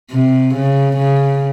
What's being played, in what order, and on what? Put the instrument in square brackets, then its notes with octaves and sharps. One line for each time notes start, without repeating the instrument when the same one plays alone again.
[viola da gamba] C3
C#3
C#3